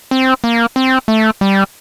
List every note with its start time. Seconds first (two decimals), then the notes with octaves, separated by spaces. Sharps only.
0.11 C4
0.44 A#3
0.76 C4
1.08 A3
1.41 G3